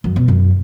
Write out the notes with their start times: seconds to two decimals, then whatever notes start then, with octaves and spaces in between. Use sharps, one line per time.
0.04 F#2
0.16 B2
0.28 F#2